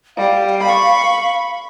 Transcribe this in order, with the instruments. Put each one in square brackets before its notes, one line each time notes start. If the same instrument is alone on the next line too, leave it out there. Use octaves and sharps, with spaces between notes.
[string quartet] G3 [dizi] F5
[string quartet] B5 C#6